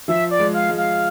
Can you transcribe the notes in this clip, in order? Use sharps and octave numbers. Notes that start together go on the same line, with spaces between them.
F3 E5
D5
G#3
F5
G#3
F5